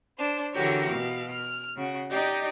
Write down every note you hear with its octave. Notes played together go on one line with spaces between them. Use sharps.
D4 C5
D3 E3 F#4 G4 A#4 C#5
B2 F5
F6
C#3 F#4
D#4 G4 D5 D#5